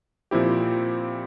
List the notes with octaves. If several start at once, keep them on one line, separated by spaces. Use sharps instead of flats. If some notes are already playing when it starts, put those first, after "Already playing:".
A#2 F3 C4 E4 G4